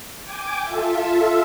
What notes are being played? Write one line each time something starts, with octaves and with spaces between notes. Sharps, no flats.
G5 G#5 D6
F4 A4 E5